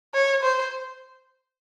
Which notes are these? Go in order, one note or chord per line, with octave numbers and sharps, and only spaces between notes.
C#5
C5